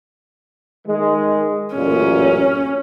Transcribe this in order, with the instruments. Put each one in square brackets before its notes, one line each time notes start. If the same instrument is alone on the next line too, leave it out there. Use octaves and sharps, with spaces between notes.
[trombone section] D#3 G#3
[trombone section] A1 F#2 A#2 [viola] C#4